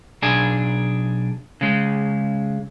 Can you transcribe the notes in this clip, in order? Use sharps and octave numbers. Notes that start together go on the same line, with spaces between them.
B1 D4 G#4
C#3 G#3